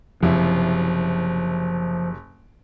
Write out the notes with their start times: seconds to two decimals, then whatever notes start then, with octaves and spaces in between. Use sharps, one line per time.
0.23 F#1 C3 F3 E4